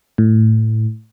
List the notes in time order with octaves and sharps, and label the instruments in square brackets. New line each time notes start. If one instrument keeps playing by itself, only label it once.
[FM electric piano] A2